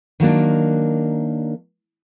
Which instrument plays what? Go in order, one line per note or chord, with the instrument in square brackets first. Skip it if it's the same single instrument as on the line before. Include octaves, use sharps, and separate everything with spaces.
[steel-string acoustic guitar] D#3 F#3 A#3 D4